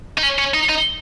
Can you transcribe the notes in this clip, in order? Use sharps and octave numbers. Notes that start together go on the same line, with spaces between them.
D#4
C#4
C#4
D#4
D#4